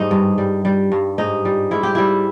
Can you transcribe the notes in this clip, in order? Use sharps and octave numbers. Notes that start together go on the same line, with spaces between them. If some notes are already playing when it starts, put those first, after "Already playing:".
Already playing: G#2 G3 D#4
G2
G3
G3
G2
G#2 D#4
G3
G#2 E4
G4
G3 E4